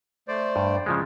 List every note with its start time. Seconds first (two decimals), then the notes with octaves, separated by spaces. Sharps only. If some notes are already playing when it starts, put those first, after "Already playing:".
0.28 A3 C5 D5
0.56 G2
0.86 C#3 F3 G#3